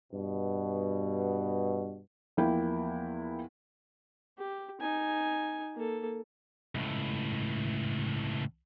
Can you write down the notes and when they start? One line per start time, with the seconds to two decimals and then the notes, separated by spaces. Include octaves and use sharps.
0.13 G2 B2
2.37 E2 F3 A#3 E4 G5
4.38 G4
4.81 D#4 G#5
5.76 A#3 A4
6.75 C#2 A2